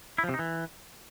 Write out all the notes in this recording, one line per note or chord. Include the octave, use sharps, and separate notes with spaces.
E4
F3
C3
D#4
E3